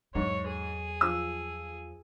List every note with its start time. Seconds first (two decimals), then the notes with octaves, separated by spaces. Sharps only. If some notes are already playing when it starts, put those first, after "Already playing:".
0.15 E2 G#2 F#3 C#5
0.48 G#4
1.01 F3 E6